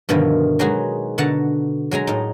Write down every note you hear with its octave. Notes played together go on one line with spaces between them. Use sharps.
G2 B2 D3 D#3 F3 E4
F#3 G#3 B3 D#4 F#4 G#4
B2 D3 F#5 A5 A#5
F#3 G#3 G#5 A#5
A2 D#4